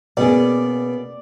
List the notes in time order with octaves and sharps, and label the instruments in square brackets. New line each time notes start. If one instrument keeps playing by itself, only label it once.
[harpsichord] B2 [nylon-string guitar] A#3 C#4 G#4 [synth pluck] D5